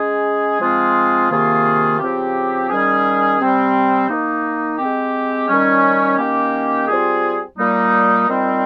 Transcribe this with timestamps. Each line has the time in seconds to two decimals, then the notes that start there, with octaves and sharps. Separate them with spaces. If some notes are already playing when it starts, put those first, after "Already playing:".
Already playing: G#3 C#4 G#4
0.60 F3 G#3 C4 F4 G#4
1.30 C3 D#3 A#3 F4 G#4
1.99 C#3 F3 C4 G4
2.69 D#3 G3 C#4 G#4
3.39 C3 G3 C4
4.09 D#3 A#3 D#4
4.78 G#3 C4 G4
5.48 D#3 G3 C#4
6.18 D#3 A#3 C#4 G4
6.87 G3 C4 F4 G#4
7.57 A#2 G3 A#3 D#4
8.27 A#2 G3 C4 D#4